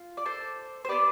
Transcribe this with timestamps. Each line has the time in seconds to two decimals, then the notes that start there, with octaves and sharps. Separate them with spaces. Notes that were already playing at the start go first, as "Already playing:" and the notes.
Already playing: F4
0.17 D5
0.26 A4 C5
0.85 C5
0.88 B3 D4 G4 B4 D5